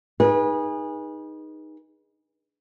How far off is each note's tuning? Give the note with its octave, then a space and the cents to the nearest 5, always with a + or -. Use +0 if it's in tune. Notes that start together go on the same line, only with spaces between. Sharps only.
D#4 +0 G#4 -20 B4 -35